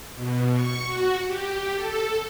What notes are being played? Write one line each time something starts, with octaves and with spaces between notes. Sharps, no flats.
B2
C#6
F#4
G4
A4